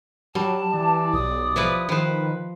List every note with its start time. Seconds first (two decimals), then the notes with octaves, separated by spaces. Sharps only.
0.35 F#3 G3 A5
0.74 E3 D5
1.13 B1 D#6
1.56 F3 E4 B4
1.89 D#3 F3 B4 C5